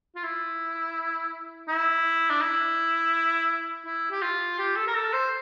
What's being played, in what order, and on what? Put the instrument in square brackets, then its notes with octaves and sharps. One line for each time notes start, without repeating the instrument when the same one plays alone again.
[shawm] F4
E4
E4
D4
E4
E4
G4
F4
G4
A4
A#4
A4
C5